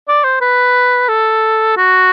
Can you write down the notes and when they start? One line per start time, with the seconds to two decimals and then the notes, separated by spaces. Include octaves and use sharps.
0.08 D5
0.24 C5
0.41 B4
1.08 A4
1.77 F#4